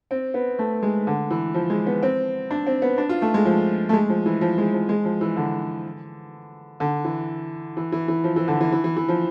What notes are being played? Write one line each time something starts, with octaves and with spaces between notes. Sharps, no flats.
C4
B3
A3
G#3
D3
E3
F3
G#3
B3
C4
D4
C4
B3
D4
F4
A3
G#3
F3
A3
G#3
F3
E3
F3
G#3
F3
G#3
F3
E3
D3
D3
E3
E3
E3
E3
F3
E3
D3
E3
E3
E3
E3
F3